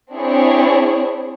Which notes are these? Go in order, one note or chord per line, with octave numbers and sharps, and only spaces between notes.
C4 D4 E4 G#4 C#5